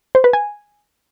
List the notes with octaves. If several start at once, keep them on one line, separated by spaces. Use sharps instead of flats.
C5
B4
G#5